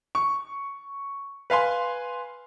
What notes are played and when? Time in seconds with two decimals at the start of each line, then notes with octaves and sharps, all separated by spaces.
0.15 C#6
1.50 B4 F5 G#5 C6